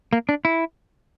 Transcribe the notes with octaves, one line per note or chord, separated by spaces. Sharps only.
A#3
D4
E4